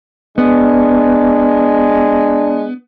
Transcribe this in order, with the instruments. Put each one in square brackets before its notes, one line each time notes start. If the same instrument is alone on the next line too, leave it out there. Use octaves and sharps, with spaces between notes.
[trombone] G#3 [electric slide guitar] B3 [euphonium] D4